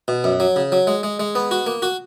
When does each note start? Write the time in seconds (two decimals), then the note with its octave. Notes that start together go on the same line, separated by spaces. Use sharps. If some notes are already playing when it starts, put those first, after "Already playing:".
0.08 B2
0.24 F#2
0.40 F#3
0.56 C#3
0.72 F#3
0.87 G#3
1.03 G#3
1.20 G#3
1.35 B3
1.51 F#4
1.66 A#3
1.82 F#4